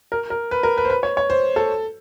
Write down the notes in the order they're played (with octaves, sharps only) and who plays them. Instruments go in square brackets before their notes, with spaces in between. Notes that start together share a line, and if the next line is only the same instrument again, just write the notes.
[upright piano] A#4
A#4
B4
A#4
B4
C5
B4
C#5
C#5
C5
A4